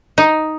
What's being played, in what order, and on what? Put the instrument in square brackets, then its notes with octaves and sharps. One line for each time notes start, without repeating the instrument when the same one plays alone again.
[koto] D#4